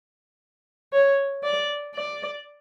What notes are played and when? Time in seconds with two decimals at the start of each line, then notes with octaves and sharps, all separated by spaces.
0.92 C#5
1.43 D5
1.95 D5